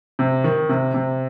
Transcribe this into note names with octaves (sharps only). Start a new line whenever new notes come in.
C3
D#3
C3
C3